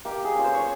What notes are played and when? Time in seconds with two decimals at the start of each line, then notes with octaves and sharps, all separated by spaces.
0.05 A#3 G4
0.25 G#4
0.35 C#4 F4
0.44 C5
0.55 C#5